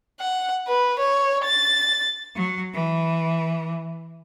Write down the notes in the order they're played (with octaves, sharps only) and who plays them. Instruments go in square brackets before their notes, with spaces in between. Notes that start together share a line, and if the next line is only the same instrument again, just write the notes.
[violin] F#5
B4
C#5
A6
[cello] F#3
E3